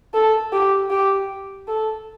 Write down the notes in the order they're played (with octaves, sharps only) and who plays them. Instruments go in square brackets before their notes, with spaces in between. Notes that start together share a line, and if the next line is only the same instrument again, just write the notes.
[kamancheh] A4
G4
G4
A4